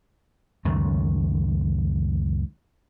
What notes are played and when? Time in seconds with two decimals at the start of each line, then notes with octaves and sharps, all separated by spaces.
0.65 C#2 F#2 D#3 A3